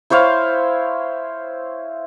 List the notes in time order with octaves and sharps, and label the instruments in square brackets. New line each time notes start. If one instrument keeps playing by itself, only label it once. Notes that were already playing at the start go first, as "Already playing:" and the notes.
[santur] E4 C5 C#5 F5